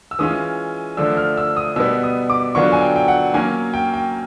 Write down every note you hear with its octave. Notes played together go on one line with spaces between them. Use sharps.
E6
E3 G#3 C#4 F4 D#6
D3 F3 A3 D4 E6
F6
E6
D#6
B2 G3 B3 E6
D#6
D6
D3 F#3 B3 D4 F4 C#6
G#5
G5
G5
F#5
F#3 A#3 C#4 G#5
G5
G5